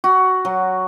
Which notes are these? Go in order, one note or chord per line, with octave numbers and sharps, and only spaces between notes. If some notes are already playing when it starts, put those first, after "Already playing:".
F#4
F#3